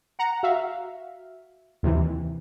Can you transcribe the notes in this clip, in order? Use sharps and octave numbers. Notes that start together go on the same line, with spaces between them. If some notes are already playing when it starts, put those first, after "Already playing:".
F#5 A#5
F#4 E5 F5
D#2 C3 E3